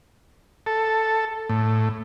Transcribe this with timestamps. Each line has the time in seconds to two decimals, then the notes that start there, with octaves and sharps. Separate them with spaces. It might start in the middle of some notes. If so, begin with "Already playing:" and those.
0.66 A4
1.50 A2